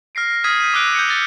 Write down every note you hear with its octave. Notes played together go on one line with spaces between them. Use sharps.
F6 A#6 C7 D7
D#6 F6 G#6 B6 C7 D#7
G6 D#7
D6 E6 F#6 D7
G6 C#7
A6 G7